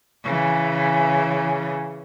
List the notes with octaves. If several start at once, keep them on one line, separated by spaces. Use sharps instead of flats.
C#3 E3